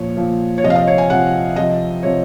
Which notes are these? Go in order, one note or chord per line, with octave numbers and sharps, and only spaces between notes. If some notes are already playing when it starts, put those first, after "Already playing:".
Already playing: A#2 F3 C#5
A#2 F3
C#5
C3 F3 D#5
F5
D#5
C#5
G#5
C3 F3 F#5
C3 F3 D#5
C3 F3 C#5